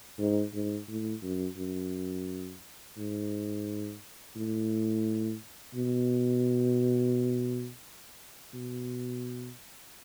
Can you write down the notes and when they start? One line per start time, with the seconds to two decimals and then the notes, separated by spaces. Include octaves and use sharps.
0.18 G#2
0.53 G#2
0.88 A2
1.22 F#2
1.57 F#2
2.97 G#2
4.36 A2
5.75 B2
8.54 B2